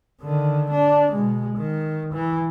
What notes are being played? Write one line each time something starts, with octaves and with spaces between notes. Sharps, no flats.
D3 D#3
D4
B2 G#3
D#3
E3